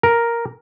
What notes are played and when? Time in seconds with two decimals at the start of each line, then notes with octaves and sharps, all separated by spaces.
0.03 A#4